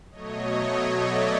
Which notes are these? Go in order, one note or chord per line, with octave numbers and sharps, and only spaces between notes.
B2 F#3 A3 C#5 D#5
D5 E5